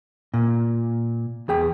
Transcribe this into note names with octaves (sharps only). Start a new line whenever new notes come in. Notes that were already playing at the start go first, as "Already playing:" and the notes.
A#2
E2 G#4 G5